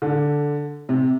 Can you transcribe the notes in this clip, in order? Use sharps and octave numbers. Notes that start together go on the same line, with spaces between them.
D3
C3